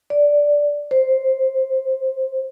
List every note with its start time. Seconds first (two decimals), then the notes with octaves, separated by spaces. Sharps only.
0.10 D5
0.91 C5